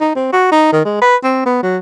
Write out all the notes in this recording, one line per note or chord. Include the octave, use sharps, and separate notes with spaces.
D#4
C4
F#4
D#4
D#3
G#3
B4
C4
B3
F#3